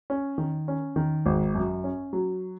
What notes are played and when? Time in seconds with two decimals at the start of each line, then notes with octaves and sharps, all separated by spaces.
0.10 C#4
0.38 D#3
0.68 C#4
0.96 D#3
1.26 G#1
1.55 F#2
1.84 C#4
2.13 F#3